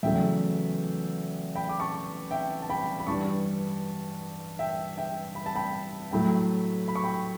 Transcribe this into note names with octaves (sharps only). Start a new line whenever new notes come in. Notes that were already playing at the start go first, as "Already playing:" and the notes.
E2 C#3 F#3 A3 E5 G5
G5 B5
D6
A5 C#6
E5 G5
A5
G5 B5
B5
G2 E3 G3 D4 A5 C#6
E5 G5
E5 G5
B5
A5
G5 B5
A2 F#3 A3 G5 B5
B5
C#6
G5 B5